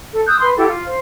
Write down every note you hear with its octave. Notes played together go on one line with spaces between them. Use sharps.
A4
D#6 E6 F#6 G6
B4 C6
E4 F#4 G4 A4
F4
C5